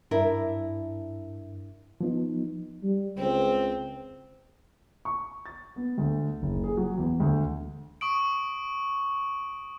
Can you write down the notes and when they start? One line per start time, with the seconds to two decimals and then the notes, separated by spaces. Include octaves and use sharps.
0.11 G2 D4 E4 A#4 E5
2.01 F3 B3 D#4
2.83 G3
3.17 C#2 C4
5.05 C#6
5.46 A6
5.76 B3
5.98 D2
6.42 F#1
6.64 G#4
6.77 F#3
6.98 E2
7.20 D2
8.01 C#6 D#6 D7